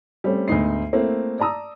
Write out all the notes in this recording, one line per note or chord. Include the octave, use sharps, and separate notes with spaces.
G3 A3 C4 C#4
D2 G#2 B3 D#4 D#5 C7
A3 A#3 C4 E4
D5 A5 A#5 D#6 E6